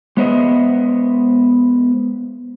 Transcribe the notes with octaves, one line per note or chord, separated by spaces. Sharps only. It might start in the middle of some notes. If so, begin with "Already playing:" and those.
G#3 B3 C5 D#5 E5